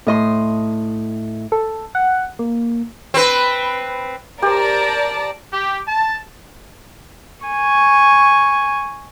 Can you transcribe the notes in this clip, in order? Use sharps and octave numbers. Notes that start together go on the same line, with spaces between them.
A2 D#5 C6
A4
F#5
A#3
C4 B4
G4 A#4 C5 D5 A5 A#5
G4
A5
G#5 C#6